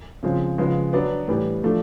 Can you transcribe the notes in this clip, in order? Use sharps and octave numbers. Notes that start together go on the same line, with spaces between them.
C#3 F3 G#3 C4
C#3 F3 G#3 B3
F#3 B3 D4
A2 E3 G3
F3 A3 D4